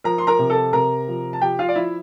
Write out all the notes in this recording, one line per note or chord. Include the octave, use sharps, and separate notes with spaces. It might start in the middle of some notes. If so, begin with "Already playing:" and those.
F3 A#4 A#5
C6
A#4 A#5
C3
A4 A5
C3 A#4 A#5
F3
A5
F3 G4 G5
F4 F5
D5
F3 E4 E5